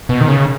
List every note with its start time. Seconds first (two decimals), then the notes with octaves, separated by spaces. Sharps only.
0.09 B2
0.21 D#3
0.28 C#3